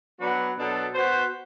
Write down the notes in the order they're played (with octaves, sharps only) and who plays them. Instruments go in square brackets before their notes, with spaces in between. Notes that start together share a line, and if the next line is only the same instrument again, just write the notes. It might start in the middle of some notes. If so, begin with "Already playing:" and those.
[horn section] F#3 B3 D4 F#4 B4
B2 F#3 B3 D4 A4
B3 F#4 C5